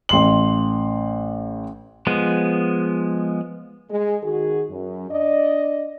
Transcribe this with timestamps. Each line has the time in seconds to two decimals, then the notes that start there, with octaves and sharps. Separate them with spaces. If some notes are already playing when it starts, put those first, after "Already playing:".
0.09 A1 C6 F#7
2.07 F3 G#3 B3
3.90 G#3
4.23 D#3 F#4 G#4
4.69 F#2
5.10 D4 D5 D#5